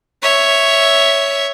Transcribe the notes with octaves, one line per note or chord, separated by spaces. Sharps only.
C#5 E5